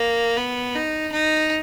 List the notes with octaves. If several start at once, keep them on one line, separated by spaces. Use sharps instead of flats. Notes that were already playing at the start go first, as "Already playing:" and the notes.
Already playing: A#3
B3
D#4
D#4